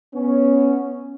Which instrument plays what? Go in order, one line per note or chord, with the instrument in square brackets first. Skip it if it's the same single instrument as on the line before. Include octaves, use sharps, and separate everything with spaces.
[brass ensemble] B3 C#4